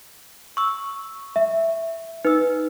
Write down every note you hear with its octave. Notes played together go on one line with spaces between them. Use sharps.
C#6 E6
E5
D#4 B4 E6